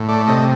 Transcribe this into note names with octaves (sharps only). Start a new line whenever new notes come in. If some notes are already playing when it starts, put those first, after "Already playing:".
Already playing: A2
A3 D5
C3 D#5